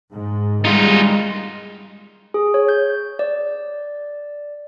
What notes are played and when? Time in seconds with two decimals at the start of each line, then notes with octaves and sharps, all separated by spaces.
0.13 G#2
0.65 D#3 G3 G#3 D#4 F4
2.34 G#4
2.54 C#5
2.69 G6
3.19 D5